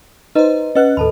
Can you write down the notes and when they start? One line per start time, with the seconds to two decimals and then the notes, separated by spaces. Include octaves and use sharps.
0.35 D#4 B4 C5 D#5 A#5
0.75 C#4 B4 D#5 F#5 F#6
0.97 D#2 A2 A4 A5 B5